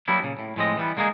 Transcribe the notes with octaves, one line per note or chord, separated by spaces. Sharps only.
F#3 G3 A#3 B3 D4 E4
A#2 C#3
A2
A2 F3 G#3 C4 D#5
E3 G3 B3
D3 G#3 A#3 D#4 G#4